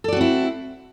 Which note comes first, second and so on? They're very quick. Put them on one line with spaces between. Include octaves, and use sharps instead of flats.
A4 D5 F#4 C4 E4